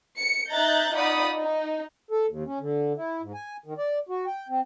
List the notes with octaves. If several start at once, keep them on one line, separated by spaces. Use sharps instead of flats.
C#7
D#4 E5 A#5 F#6 G6 A6
D#4 F4 D5 F#5 B5 D#6
D#4
A4
D#2
C#4
D3
E4
G#2
G#5
D#3
D5
F#4
G5
C4